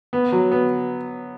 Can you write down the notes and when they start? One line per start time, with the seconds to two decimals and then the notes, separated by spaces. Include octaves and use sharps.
0.13 B3
0.32 F#3
0.52 B3